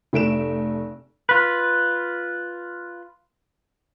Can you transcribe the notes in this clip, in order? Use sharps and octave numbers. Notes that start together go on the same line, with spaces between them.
F1 A3 D7 E7
F4 B4